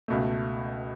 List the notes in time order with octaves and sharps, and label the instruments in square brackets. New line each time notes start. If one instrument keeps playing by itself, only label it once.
[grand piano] C#2 B2 A3